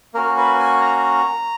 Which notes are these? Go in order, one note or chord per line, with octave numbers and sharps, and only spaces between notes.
A#3 C#4 F#4 A#4
B4
G#5
A#5